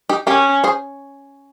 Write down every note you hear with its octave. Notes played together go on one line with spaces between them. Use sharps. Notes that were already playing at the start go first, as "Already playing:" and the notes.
D#4 G4
C#4 G4 A#4
G#4 C5